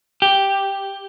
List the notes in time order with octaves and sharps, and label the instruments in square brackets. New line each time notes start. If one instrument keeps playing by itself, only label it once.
[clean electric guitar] G4